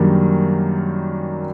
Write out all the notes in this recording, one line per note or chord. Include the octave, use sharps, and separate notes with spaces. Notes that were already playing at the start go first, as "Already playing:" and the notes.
Already playing: F#2 D#3 G3 A#3 D4